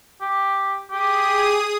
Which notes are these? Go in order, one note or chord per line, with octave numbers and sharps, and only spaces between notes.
G4
G4 G#4 D#6